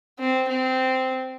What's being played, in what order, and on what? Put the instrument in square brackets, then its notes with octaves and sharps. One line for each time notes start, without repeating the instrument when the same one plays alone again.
[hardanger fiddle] C4
C4